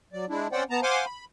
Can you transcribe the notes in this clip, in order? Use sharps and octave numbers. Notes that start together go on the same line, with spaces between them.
F#3 D5
G#3 D4 E4
C4 C#4 C5 D5 F#5 G5
B3 A5 A#5
C5 F5 F#5 G#5 C6 D6
B5